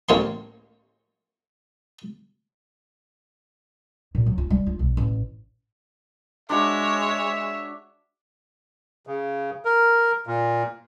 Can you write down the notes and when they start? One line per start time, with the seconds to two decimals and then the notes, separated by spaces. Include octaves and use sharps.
0.09 A1 A#3 C#5 C6
4.15 A#2
4.26 F#3
4.38 F4
4.50 G3
4.66 F4
4.79 B1
4.97 A1
6.49 G#3 D4 F#4 C#5 E5
9.07 C#3
9.65 A#4
10.27 A#2